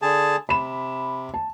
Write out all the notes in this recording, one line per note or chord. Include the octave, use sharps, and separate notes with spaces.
D3 G#4 A5
C3 B5 E7
A5